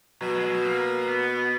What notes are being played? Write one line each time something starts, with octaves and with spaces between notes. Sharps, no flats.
B2 F#3
G#3
F#3
A#3
B3